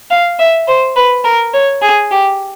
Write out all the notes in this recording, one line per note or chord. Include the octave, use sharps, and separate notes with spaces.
F5
E5
C5
B4
A#4
C#5
G#4
G4